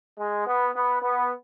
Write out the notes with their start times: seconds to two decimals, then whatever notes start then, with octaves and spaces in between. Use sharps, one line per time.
0.18 G#3
0.46 B3
0.74 B3
1.02 B3